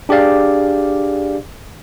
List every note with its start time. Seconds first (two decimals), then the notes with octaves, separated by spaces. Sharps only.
0.09 D4 G4 G#4 D5 F5